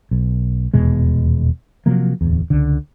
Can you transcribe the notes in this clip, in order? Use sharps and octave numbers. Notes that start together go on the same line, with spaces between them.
B1
D#1 E2 B2 G#3
C3 F3 F#3 A#3
D1 E2
C#2 D3